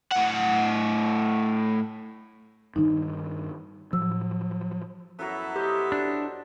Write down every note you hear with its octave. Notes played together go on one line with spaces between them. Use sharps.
A2 F#5
G2 D#3 D#4
A2 F3 F#3 E6
F#2 F#3 B3 E4 A4 A#5
G4 C5 D#5
D4